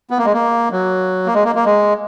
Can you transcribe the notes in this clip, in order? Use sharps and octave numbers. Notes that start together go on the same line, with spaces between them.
B3
A#3
G#3
A#3
F#3
A#3
G#3
A#3
A#3
G#3